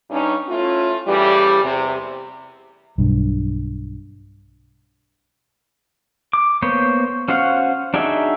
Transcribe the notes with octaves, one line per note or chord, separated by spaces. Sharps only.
G2 C#4 D#4
A3 C#4 E4 F4
A2 C#3 E3 G3
E2 C3
B1 G2
D6
A#3 B3 C5 C#5
C#4 F#4 C5 F5 F#5
D4 D#4 F#4 G#4 E5